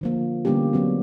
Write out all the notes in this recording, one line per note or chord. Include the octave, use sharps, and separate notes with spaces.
D3 F3 A#3
D3 G3 A#3 B3 C#4 G4
F#3 B3 C4 F#4